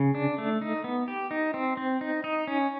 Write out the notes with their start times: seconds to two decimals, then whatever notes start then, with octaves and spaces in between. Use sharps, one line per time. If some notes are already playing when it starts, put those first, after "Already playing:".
Already playing: C#3
0.15 D4
0.38 A3
0.62 D#4
0.84 B3
1.08 G4
1.31 D#4
1.54 C4
1.77 C4
2.01 D#4
2.24 D#4
2.47 C#4